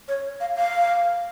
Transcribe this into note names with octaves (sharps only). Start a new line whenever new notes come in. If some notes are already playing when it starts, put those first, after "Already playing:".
C#5
F5
F5